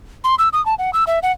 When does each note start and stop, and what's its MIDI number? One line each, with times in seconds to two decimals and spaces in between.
0.24 0.35 84
0.39 0.49 88
0.53 0.64 87
0.66 0.74 81
0.78 0.90 78
0.93 1.04 88
1.07 1.19 76
1.23 1.32 78